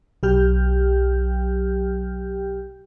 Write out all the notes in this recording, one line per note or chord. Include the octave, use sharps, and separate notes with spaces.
B1 F#3 G4 G5 F6 G6